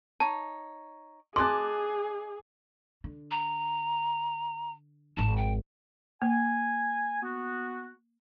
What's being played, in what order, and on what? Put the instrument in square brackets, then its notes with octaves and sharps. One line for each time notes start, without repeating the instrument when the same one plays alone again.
[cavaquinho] D#4 C#5 [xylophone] A5
[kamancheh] G#4 [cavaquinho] D#5 G#5 A5 [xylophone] C6 [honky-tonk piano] D6 F#6
[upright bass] D3
[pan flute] A#5
[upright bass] G#1 F2 [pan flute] A5
[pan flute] G5
[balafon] A#3 [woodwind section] G#5
[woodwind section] B3 F#4